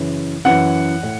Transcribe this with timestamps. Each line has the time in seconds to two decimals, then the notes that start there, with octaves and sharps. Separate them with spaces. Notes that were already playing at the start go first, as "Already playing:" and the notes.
Already playing: F#2 C#3 E3
0.45 F#2 E3 F#5
1.03 A2